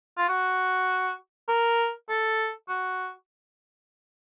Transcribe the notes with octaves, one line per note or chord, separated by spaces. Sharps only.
F4
F#4
A#4
A4
F#4